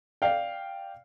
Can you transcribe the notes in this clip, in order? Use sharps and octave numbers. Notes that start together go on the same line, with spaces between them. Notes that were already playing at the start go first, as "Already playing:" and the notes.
D5 F5 G5